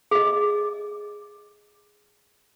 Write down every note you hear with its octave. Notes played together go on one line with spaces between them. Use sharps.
G#4 D#5